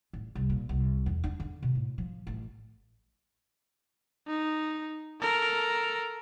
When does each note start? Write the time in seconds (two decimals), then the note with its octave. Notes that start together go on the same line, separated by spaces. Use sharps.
0.13 A1
0.35 C2
0.50 A#2
0.69 C2
1.06 E2
1.24 D4
1.40 D3
1.63 B2
1.75 A2
1.98 F3
2.27 A1
4.28 D#4
5.21 A4 A#4